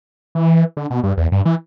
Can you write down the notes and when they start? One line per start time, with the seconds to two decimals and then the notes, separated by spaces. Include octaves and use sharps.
0.35 E3
0.77 D3
0.90 B2
1.03 G2
1.17 E2
1.32 G2
1.45 E3